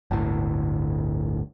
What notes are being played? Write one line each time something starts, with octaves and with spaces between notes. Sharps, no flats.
G1 D2 A2